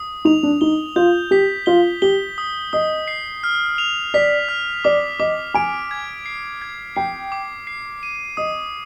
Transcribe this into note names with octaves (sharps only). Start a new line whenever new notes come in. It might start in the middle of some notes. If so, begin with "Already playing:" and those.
Already playing: D#6
D#4 F7
D4
D#4 G7
F4 G6
G4 B6
F4 G7
G4 G7
D#6
D#5 D#6
C7
F6
F7
D5 B6
F6
D5 D6
D#5 D6
G#5 D7
G#6
C7
G#6
G5 C7
D6
C7
D#7
D#5 D#6